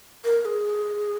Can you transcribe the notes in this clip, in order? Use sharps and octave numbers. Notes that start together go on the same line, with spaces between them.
A#4
A#4
G#4